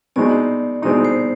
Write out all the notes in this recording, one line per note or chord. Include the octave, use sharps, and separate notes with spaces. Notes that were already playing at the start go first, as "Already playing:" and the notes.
B2 G#3 C4 D#4 D5
B2 G#3 C4 D#4 D5
C5